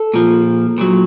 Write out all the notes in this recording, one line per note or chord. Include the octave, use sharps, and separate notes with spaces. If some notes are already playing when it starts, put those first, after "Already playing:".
Already playing: A4
A#2 F3
A#2 F#3